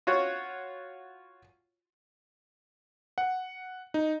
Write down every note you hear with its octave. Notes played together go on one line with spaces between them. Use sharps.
F4 F#4 C#5
F#5
D#4